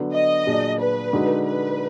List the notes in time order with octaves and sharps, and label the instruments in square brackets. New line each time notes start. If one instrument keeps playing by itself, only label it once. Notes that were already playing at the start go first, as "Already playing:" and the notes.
Already playing: [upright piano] D3 F#3 B3
[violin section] D#5
[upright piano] A#2 F#3 D4 G#4
[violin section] B4
[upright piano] D3 G#3 D#4 F#4
[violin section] B4